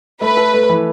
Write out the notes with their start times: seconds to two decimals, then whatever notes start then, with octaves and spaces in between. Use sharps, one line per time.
0.21 A3 B4
0.37 A4
0.54 A3
0.69 E3